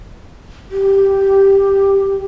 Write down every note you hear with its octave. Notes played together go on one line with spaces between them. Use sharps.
G4